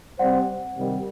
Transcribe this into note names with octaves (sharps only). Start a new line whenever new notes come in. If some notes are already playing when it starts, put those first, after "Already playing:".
C3 G3 C4 G4 C5 D5 F#5
C3 D#3 G3